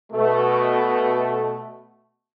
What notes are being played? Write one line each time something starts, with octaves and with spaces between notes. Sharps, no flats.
B2 A3